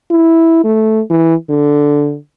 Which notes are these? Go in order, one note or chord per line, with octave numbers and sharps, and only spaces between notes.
E4
A3
E3
D3